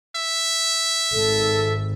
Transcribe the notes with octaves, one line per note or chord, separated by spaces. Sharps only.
E5
G#1 A4